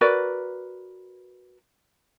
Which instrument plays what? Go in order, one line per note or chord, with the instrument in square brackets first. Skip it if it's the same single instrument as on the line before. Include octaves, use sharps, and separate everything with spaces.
[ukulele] F#4 A#4 B4 D5